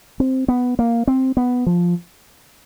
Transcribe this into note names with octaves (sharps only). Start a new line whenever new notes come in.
C4
B3
A#3
C4
B3
F3